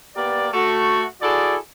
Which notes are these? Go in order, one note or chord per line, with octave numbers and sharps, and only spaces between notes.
A#3 B3 G4 D5
A3 F#4 A4
E4 F#4 G#4 A4 D5